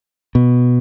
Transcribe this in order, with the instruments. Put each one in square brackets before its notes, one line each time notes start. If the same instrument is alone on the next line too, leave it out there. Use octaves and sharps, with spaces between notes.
[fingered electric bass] B2